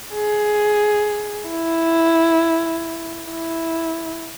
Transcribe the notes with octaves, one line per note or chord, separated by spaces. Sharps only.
G#4
E4
E4